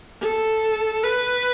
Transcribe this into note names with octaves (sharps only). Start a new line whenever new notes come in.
A4
B4